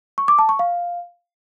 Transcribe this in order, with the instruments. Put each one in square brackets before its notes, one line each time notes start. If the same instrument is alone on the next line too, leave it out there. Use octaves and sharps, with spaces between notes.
[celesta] C#6
D6
A5
C#6
F5